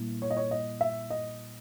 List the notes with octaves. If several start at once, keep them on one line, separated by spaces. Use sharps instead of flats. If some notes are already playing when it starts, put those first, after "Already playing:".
Already playing: A#2 G3 A#3 E4
C#5
D#5
C#5
D#5
E5
D#5